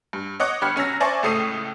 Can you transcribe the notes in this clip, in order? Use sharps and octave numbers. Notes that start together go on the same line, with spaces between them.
G2
C#5 D#5 F#5 D6 F#6
G1 G4 B5 F6 G#6 C#7
B1 C#4 A#5 E6 A#6
C5 D5 E5 G#5 A5 C#6
C#2 A2 A3 D#6 C7 D#7